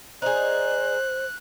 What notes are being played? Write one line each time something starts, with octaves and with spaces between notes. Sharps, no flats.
D#4 G#4 C5 D5 F#6